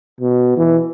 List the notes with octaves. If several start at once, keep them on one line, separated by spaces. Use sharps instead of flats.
B2
E3